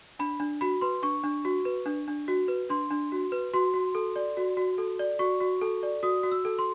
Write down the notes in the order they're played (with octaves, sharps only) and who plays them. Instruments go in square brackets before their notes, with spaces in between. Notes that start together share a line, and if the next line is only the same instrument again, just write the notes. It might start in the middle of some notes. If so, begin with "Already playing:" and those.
[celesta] D4 B5
D4
F#4 B5
B4 C6
D4 C#6
D4
F#4
B4
D4
D4
F#4
B4
D4 C6
D4
F#4
B4
F#4 C6
F#4
A4
D5
F#4
F#4
A4
D5
F#4 C#6
F#4
A4
D5
F#4 D#6
F#4
E6
A4
C6